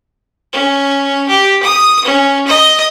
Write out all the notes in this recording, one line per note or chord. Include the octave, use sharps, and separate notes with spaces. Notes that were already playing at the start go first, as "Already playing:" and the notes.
C#4
G4
D#6
C#4
D#5